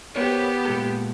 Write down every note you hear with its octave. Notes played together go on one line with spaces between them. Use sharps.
B3 G4 A#4 C5 C#5
A#2 G#3 A4